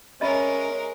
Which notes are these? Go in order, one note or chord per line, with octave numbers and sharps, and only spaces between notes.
G#3 C#4 A#4 D#5 E5 B5